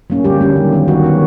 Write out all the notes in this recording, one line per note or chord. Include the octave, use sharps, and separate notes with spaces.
F#3 A#3 C#4
D3 G3 G4
F#3 A#3 C#4
D#3
F#3 B3
D#3 F#3 F#4
F#3 B3